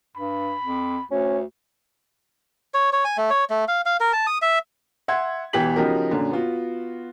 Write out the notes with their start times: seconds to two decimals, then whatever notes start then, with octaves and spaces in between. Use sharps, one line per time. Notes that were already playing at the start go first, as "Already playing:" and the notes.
0.16 G2 B5
0.64 F2
1.11 D2 C#4
2.74 C#5
2.93 C#5
3.05 G#5
3.17 A3
3.30 C#5
3.50 A3
3.68 F5
3.86 F5
4.00 A#4
4.13 A5
4.27 D#6
4.42 E5
5.08 E5 F#5 C6 G#6
5.53 E1 B1 E3 G4 B6 F#7
5.76 C#3 F3 D#4 F#4 G4 A#4
6.11 F#2 A#2 D3
6.31 B3 F4 F#4